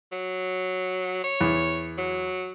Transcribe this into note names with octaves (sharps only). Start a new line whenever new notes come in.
F#3
C#5
E2
F#3